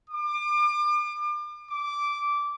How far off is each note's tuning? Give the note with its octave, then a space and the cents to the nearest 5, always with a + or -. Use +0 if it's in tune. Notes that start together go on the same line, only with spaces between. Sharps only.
D6 +35
D6 -10